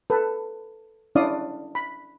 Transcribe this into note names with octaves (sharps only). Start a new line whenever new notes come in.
A4 B4
C#4 D4 E4 D5 F5 D#6
B5